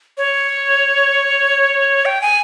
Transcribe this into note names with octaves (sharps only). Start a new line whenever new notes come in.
C#5
G5
G#5